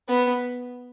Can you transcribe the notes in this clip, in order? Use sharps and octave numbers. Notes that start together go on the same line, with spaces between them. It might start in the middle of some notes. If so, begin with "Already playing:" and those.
B3